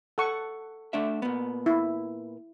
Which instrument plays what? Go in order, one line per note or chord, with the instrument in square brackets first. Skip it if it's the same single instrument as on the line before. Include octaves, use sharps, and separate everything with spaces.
[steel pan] A4 F#5 C#6
[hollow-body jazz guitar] A3 D4 E5
A#2 B3
[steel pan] E4